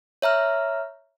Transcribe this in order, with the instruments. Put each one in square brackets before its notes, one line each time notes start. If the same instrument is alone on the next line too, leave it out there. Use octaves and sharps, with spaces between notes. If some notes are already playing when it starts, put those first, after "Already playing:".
[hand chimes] C#5 E5 A#5 F6